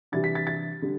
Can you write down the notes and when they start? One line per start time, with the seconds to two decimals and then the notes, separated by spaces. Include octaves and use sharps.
0.12 C3 E3 G3 D4 A6
0.24 B6
0.35 A6
0.47 A6
0.82 D3 G3